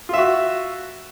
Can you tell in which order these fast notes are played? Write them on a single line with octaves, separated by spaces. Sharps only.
F4 E5 F#4